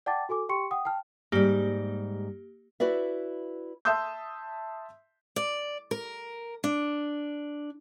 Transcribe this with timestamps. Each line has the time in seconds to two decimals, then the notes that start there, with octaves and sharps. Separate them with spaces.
0.06 D5 F#5 G5 A5 D6 A6
0.29 F#4 A4 G#5 D6
0.49 G4 G5 C6 C#6 C#7
0.71 F#5 G5 D#6
0.85 G5 A5 F6
1.32 G#2 G3 A#3 G4
2.80 E4 F#4 B4 D5 E5
3.85 E5 A5 C6 D#6 E6 G6
5.36 D5
5.91 A#4
6.64 D4